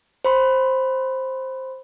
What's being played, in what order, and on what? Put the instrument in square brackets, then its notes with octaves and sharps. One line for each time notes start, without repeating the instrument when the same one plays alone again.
[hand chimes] C5 B5 C6